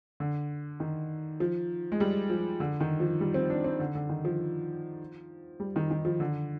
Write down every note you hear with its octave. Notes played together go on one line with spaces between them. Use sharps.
D3
D#3
F3
G#3
G3
F3
D3
D#3
F3
G3
C4
D4
C4
D3
D3
D#3
F3
G3
D#3
D#3
F3
D3